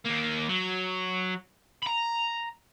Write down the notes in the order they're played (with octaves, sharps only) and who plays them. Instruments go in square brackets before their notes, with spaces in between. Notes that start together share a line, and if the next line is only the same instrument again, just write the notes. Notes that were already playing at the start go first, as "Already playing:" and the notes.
[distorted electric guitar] D#2 A#3
F#3
A#5 B5